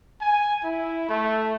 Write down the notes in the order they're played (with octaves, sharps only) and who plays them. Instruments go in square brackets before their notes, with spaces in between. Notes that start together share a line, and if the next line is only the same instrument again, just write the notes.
[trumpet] G#5
E4
A3